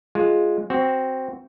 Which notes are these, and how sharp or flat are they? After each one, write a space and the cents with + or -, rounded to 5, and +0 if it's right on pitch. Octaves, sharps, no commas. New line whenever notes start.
G#3 +0 F4 +0
C4 +0 F#4 +10